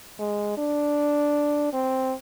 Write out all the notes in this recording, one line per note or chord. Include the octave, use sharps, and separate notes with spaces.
G#3
D4
C4